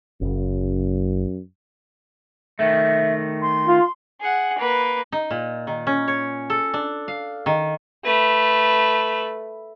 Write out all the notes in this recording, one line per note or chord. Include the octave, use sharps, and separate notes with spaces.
F#1 F#2 C#3
D#3 A3 E5
C6
F4
G#4 F#5
A#3 B4
D#4
A#2
D#3
C#4
C#5
A4
D4
F5
D#3
A3 B4